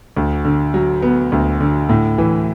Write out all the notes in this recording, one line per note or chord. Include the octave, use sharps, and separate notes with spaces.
D2
D3
F#3
B3
D2
D3
A2
E3